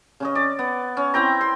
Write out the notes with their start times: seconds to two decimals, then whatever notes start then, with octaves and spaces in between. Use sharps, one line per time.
0.20 C#3 C#4 D#5
0.35 D5
0.59 B3
0.97 C#4
1.14 C4 E4 G5 A#5
1.41 C6